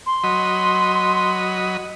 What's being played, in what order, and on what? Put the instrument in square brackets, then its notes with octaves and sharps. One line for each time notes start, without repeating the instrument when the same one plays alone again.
[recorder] C6
[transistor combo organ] F#3 D#5 B5